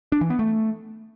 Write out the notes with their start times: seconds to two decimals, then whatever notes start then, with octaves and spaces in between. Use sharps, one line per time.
0.12 D4
0.21 E3
0.30 B3
0.39 A3